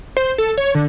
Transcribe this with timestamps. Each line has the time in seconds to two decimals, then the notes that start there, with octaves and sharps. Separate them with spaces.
0.17 C5
0.38 A4
0.58 C#5
0.75 D3